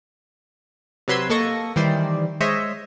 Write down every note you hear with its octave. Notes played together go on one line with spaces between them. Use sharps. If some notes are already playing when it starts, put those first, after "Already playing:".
C3 F#3 B4 C6 E6 G#6
A#3 A4 D#5 C#6 A#6
D#3 E3 G3 C5 D5
G#3 C5 C#5 D#5 E5